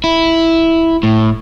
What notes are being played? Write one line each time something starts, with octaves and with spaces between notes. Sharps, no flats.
E4
A2